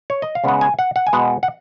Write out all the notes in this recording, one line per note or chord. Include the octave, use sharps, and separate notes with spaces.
C#5
D#5
F5
C#3 G#3 B3 F#5
G#5
F#5
F#5
G#5
B2 G#3 B3 F#5
F#5